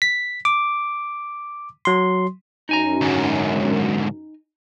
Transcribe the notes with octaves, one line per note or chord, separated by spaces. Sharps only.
B6
D6
F#3 C6
F#2 D#4 G#5 A#5
D2 G#2